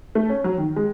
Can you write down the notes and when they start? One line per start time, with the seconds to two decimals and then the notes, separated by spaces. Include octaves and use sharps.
0.15 A3
0.29 C#4
0.44 F#3
0.58 D#3
0.76 G#3